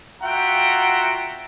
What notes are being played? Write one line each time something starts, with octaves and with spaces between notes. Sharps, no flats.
F4 F#4 E5 F#5 G5 A#5